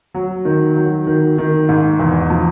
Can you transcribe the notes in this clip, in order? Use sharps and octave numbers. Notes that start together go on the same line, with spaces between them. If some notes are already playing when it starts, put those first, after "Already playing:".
F#3
D#3
F#3
D#3
D#3
G#2
E2
F3